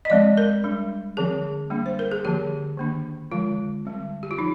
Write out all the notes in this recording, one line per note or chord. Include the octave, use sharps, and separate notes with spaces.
D#5
F3 G#3 C4 D5
A#4
G3 D4
D3 F3 C4 G#4
G3 A#3 D4
C5
A#4
G#4
D3 F3 A#3 G4
D#3 A#3 D4
D3 F3 G#3 F4
D3 G3 C4
G4
F4
F3 D#4